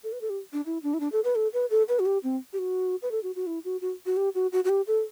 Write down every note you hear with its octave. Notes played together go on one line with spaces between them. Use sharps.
A4
B4
A4
G4
D4
E4
D4
E4
D4
A4
B4
A4
B4
A4
B4
F#4
G4
C4
G4
F#4
B4
A4
F#4
F#4
E4
F#4
F#4
F#4
G4
F#4
F#4
F#4
G4
A4